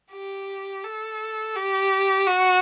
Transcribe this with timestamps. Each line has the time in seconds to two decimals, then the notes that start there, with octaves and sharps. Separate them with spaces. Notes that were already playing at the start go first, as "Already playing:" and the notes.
0.12 G4
0.84 A4
1.56 G4
2.27 F#4